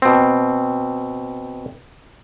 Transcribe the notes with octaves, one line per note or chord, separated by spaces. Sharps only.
B2 C4